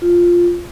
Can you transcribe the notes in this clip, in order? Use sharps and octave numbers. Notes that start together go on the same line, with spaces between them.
F4